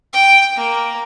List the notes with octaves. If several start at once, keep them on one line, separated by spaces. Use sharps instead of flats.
G5
A#3